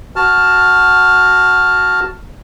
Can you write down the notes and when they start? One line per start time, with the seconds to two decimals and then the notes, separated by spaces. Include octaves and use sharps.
0.16 F#4 A5 F6